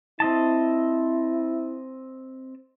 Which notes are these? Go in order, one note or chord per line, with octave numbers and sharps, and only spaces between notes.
C4 E4 D#5 A5